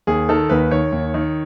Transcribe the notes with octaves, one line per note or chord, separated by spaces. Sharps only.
D#2 G#4
D#3 A4
D#2 B4
D#3 C#5
D#2
D#3